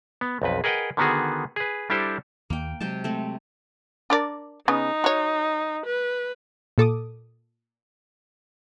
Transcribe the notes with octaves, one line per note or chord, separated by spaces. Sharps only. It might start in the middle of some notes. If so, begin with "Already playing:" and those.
B3
B1 F2 B4
G#4 A#4 B4 D#5 F#5 G5
D3 D#3 B3 F#4 G#4
G#4 B4
G3 D4 E4 G4 A4 C5
D#2 A#3 G5
C3 F#3 G#3 G5 A5
A3 C4
D4 A#4 D5
C#3 B3 D#4
F#4 C#5
B4
A#2 A4 D6 D#6